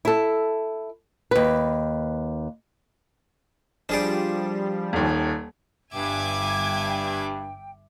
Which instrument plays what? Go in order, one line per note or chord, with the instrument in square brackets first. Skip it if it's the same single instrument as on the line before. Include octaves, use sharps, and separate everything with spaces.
[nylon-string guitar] E4 A4
D#2 B4
[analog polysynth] F3 G3 [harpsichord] D4 G#4 D5
[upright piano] D#1 D#2
[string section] G1 G#5 G#6 [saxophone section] G2 [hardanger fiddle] E5 D6 [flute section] G5